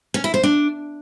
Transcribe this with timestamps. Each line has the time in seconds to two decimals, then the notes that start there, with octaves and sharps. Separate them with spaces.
0.14 C#4
0.24 E4
0.34 C5
0.43 D4